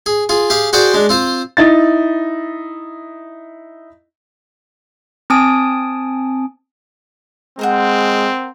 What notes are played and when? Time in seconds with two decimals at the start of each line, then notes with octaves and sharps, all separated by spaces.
0.06 G#4
0.29 F4 G#4
0.50 G4 G#4 F5
0.73 F#4 G#4 C5 D5 G5
0.94 G#3 D4
1.09 C4 F4 C5
1.57 D#4 E4 A6
5.30 C4 G#5 A5 D#6 D7
7.59 G#3 C4 A#4 C5 F#5